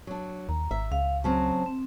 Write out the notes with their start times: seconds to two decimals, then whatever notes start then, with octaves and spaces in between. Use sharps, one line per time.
0.07 F#3 D4
0.49 D#2 A#5
0.71 G#1 E5
0.92 C#2 F5
1.24 C#3 F#3 C4 A5
1.66 C4